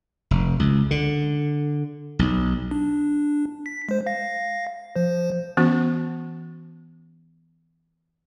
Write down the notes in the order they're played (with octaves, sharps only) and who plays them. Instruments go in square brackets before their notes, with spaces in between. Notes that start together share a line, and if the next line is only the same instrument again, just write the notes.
[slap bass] F1
C#2
D3
B1
[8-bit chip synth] D4
B6
G#3 C5
F5 A#6
F3 C5
[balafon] E3 B3 C#4 F#4